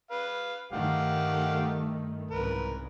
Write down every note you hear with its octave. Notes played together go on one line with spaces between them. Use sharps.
B4 F5
G2 D#3 A3 G4 F5 F#5
C2 G#2 C#3 A#4 B4